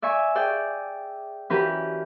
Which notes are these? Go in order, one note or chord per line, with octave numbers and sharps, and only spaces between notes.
D5 E5 G#5 C#6
G#4 D5 G5
E3 C#4 F#4 G4 A#4 B4